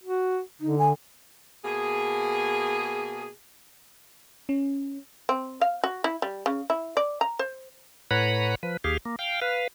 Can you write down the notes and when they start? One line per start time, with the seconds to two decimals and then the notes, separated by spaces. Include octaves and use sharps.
0.04 F#4
0.61 D3 D#4
0.79 G#5
1.65 B2 A#3 G#4
4.49 C#4
5.29 C4
5.61 F5
5.84 F#4
6.04 E4
6.22 G3
6.46 C#3
6.70 E4
6.97 D5
7.21 A#5
7.39 C5
8.11 A2 B4 C#5 F#5 A#5 B5
8.63 F3 B4
8.84 D#2 G4 G#4 F5
9.05 A#3
9.19 F5 G5
9.42 B4 F5